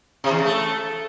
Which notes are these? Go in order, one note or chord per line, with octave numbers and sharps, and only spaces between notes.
C3
E2
C#3
A3